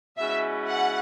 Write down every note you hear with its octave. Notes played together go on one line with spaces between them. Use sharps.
B2 G#3 C#4 E4 E5
F#5